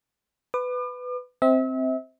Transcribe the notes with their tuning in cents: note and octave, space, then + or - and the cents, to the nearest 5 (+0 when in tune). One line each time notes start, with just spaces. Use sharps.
B4 +15 D6 +45
C4 +0 E5 -35